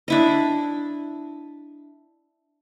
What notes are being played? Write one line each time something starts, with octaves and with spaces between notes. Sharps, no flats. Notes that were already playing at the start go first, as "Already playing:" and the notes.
D4 E4 D#5